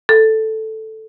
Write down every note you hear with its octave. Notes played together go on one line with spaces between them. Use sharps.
A4